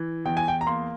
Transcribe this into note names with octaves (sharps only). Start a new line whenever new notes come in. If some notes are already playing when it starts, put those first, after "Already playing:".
Already playing: E3
E2 G5
G#5
G5
A#5
A#3 C6